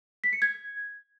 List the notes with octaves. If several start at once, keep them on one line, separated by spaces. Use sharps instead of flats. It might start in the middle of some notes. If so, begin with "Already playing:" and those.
B6
C#7
G#6